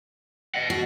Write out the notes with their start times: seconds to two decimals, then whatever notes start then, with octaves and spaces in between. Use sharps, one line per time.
0.55 D#5 F#5
0.70 F#4